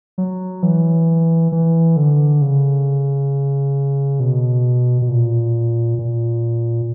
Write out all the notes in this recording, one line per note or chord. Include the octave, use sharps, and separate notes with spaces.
F#3
E3
E3
D3
C#3
B2
B2
A#2
A#2